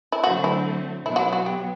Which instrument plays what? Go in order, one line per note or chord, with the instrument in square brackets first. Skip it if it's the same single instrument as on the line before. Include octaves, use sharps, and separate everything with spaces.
[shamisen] E4
[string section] D3 F#3 A3 C4 [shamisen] F#4
[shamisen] E4
[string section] B2 F#3 B3 [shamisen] E4
[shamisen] F#4
E4
F#4
G4